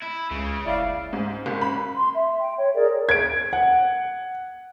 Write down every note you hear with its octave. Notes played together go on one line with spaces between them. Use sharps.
E4
C#2 C#3
F#1 E4 D5 F5
G#2
F#1
B5
C6
E5
G5
C#5
G#4 A#4 D5
G#6 D7
F#5